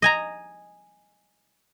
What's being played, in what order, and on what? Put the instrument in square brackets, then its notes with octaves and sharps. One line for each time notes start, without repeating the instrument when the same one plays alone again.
[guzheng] D#5 G#5 A#5